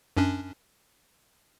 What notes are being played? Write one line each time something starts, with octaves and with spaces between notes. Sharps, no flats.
F#2 C#4 D4